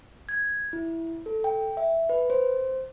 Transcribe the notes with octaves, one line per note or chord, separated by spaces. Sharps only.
G#6
E4
A4
G5
E5
B4
C5